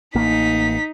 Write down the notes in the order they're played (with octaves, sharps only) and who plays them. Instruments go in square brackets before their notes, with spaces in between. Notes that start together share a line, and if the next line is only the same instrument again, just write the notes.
[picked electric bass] A1 A#3 [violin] D#4 B6